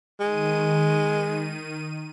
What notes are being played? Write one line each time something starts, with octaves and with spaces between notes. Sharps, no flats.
D#3 G#3 D#7